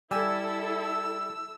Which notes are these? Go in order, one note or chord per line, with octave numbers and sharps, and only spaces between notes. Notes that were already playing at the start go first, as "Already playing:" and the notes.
G3 E4 A4 G#5 E6